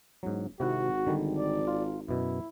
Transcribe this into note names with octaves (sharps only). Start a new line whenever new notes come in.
E1 G#2 F#3
G#1 C3 E4 F#4 F#5
G#1 D3 D#3 G3
D5
F4
F#2 B2 E4